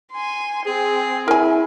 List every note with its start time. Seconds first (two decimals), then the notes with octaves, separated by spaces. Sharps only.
0.12 G#5 C6
0.66 C4 G#4
1.28 E4 A#4 G#5